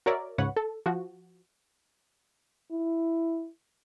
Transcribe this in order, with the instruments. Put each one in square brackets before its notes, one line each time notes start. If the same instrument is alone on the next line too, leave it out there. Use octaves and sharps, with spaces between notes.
[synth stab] F#4 A#4 C#5 D5 E5
C#2 G#2 B4 C#5 F#5
A4
F3 F#4
[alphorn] E4